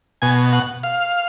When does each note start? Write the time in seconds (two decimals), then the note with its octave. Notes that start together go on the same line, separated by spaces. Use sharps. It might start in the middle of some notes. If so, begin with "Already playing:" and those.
0.22 B2 G#5
0.53 F#5
0.83 F5